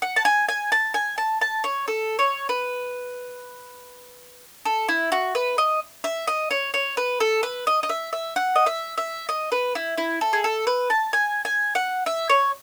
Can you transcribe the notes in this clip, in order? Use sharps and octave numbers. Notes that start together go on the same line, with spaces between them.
F#5
A5
G#5
G#5
A5
G#5
A5
A5
C#5
A4
C#5
B4
A4
E4
F#4
B4
D#5
E5
D#5
C#5
C#5
B4
A4
B4
D#5
D#5
E5
E5
F#5
D#5
E5
E5
D#5
B4
E4
E4
A4
G#4
A4
B4
A5
G#5
G#5
F#5
E5
C#5